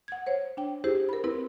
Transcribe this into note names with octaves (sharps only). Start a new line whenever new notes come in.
F#5 G#6
C5 C#5
D4 G5
E4 G4 G#4 C5
A#4 B5
C4 E4 A#4 B4